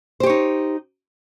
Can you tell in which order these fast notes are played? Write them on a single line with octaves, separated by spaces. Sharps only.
C5 G4 C#5 D#4